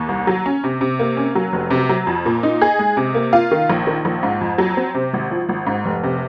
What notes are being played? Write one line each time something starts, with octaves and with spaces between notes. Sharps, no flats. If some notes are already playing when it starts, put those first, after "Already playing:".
Already playing: D#2
C2
F#3
C#4
C3
C3
A#3
C#4
F#3
F1
C3
F#3
F2
A#2
D#4
G#4
G#3
C3
A#3
F4
D#3
A#1
D#3
A#1
G#2
F2
F#3
C4
C3
G#1
F3
G#1
G#2
F1
C3